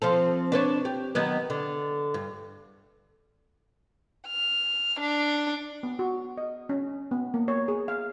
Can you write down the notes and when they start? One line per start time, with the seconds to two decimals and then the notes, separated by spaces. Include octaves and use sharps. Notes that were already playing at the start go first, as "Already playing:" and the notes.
0.02 F3 C4 A4
0.52 D4 B4 C#5
0.85 G4
1.15 D#3 F#3 B3
1.50 D3
2.14 G2
4.27 F6
5.00 D4
5.83 B3
5.99 F#4
6.38 D#5
6.69 C#4
7.11 B3
7.34 A#3
7.48 C#5
7.68 G#4
7.88 F5